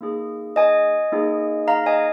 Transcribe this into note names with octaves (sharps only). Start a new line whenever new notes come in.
A#3 D#4 G#4
D#5 G#5
A#3 D#4 G#4
F5 A#5
D#5 G#5